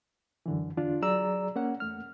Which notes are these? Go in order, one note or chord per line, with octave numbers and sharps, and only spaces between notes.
F#2 D3 E3
E2 D3 D4 F4
F#3 G#4 D5 A#5 E6
A#3 C#4 F#5
E2 A3 F6